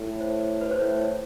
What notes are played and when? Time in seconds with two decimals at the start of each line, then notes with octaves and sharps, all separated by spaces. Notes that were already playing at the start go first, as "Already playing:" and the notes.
Already playing: A2
0.21 C5
0.61 B4
0.71 C5
0.79 A2 C#5